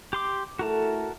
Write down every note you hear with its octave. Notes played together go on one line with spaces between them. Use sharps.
G4 C6 D6
A3 E4 F#4 A4 A#4 A5